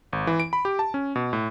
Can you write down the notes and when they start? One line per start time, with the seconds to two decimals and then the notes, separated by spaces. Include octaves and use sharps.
0.13 G#1
0.27 E3
0.40 D7
0.53 B5
0.65 G4
0.79 A5
0.94 C#4
1.16 B2
1.33 A2